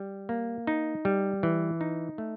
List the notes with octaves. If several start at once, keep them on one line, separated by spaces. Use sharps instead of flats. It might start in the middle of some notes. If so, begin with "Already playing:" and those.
Already playing: G3
A#3
D#4
G3
E3
D#4
A3